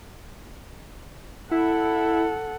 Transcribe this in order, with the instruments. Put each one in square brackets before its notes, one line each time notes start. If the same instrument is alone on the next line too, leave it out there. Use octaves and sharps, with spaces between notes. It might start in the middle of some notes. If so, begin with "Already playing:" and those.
[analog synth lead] E4 [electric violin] A4 F#5